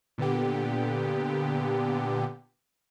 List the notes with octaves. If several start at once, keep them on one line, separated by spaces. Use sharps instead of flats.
A#2 D3 B3 G4